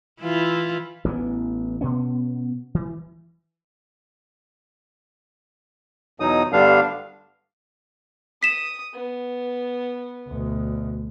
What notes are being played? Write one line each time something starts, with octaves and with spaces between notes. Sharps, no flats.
E3 E4 F4
A1 E3 G3 B3
B2 B3 C#4
E3
E2 B2 F#3 D#4 D#6
G2 D3 G3 B3 D4 F5
D#6 B6 E7
B3
D2 B2